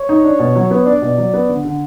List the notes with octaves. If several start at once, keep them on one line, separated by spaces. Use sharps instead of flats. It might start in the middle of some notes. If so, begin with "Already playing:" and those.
Already playing: C#5
D#4
D4
B2
F#3
B3
D4 D5
B2
F#3
B3
D3
D3